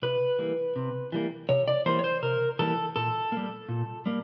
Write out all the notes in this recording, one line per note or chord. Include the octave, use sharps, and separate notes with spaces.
C3 B4
E3 G3 A#3
C3
E3 G3 A#3
C3 C#5
D5
E3 G3 A#3 C5
C#5
C5
C3 A#4
E3 G3 A#3 A4
A#2 A4
G3 A#3
A#2
G3 A#3